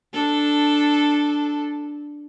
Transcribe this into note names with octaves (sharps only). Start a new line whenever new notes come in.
D4 A4